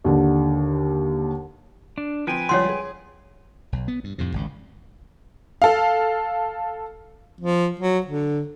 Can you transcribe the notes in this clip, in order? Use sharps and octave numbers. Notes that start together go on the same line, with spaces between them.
D#2 D3
D4
F3 C4 B4 G5 G#5
C#2 F3 G3 C#5 F#5 C6
G#4
B1
B3
G2
F2 A2 C3
G#1 C#2
A4 F5
F3
F#3
D3